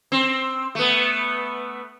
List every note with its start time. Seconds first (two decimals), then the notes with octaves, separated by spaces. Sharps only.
0.12 C4
0.75 A3 B3